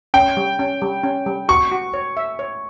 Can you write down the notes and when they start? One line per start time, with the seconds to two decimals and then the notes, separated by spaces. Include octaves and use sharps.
0.14 C#4 G5
0.37 G3
0.59 C#4
0.82 G3
1.04 C#4
1.26 G3
1.49 F#4 C#6
1.71 F#4
1.94 C#5
2.17 E5
2.39 C#5